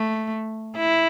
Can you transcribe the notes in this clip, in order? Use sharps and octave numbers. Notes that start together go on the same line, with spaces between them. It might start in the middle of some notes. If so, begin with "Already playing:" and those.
Already playing: A3
E4